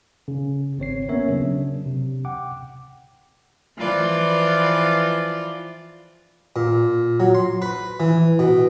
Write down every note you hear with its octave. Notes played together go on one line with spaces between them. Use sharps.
C#3
G#1 C4 C#5 C7
A#3 B3 C#4 A#4 C#5 E5
C#3 F#3 D4
C3
F#5 G5 D6
E3 F3 E4 F4 B4 D5
A#2
F#3
C6
B4
E3
B2